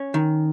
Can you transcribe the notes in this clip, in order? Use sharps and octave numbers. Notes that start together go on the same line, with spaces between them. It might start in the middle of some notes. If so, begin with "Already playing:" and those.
Already playing: C#4
D#3